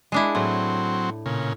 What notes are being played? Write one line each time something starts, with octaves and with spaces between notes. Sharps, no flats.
G#3 D4 E4
A2 F#3 C4
A#2 C#3